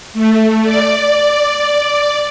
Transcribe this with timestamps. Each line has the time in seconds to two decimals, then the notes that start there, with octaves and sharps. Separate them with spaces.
0.14 A3
0.64 D5